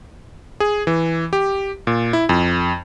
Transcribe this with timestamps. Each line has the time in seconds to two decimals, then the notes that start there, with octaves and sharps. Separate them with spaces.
0.60 G#4
0.87 E3
1.33 G4
1.87 A#2
2.13 E4
2.29 F2